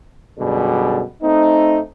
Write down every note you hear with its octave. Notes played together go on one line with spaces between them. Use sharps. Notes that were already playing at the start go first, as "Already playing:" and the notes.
F#2 B2 D3 G3 G#4
A3 C4 D#4